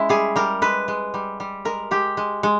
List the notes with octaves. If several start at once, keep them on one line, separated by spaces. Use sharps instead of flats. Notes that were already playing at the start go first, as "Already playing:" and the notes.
Already playing: G#3 C#4 E4
G3 G#4
G3 A#4
G#3 B4
G#3
G3
G3
G#3 A#4
G#3 G4
G#3
G#3